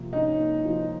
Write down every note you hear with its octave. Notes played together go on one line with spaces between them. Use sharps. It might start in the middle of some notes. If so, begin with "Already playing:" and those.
Already playing: C3 F3 A#3
C#4 D#4
A#3
F3